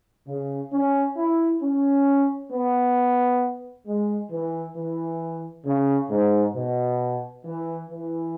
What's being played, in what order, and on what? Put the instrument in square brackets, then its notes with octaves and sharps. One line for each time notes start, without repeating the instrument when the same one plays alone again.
[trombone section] C#3
C#4
E4
C#4
B3
G#3
E3
E3
C#3
G#2
B2
E3
E3